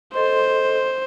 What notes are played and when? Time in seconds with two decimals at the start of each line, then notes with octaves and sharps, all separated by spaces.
0.14 A4 C5 D#5 C6